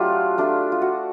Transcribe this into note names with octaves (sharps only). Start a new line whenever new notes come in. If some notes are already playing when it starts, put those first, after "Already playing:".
Already playing: F#3 A3 D4 F4 G4
A3 D4 F4
F4
F#4